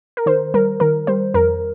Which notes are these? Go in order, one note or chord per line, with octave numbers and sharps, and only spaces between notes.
A#4
D#3 C5
G3 A#4
D#3 A#4
G3 C5
F2 A#4